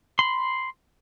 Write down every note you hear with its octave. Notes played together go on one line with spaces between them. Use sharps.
B5 C6